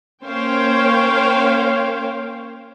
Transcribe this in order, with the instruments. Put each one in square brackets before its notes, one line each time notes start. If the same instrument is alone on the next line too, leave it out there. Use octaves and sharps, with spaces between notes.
[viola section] A#3 C#4 C5 C#5 F5 G5